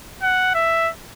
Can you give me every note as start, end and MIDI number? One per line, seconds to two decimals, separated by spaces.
0.23 0.53 78
0.54 0.90 76